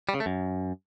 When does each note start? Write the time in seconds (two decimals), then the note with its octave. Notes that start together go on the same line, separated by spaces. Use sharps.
0.09 G3
0.14 C#3
0.20 A3
0.26 F#2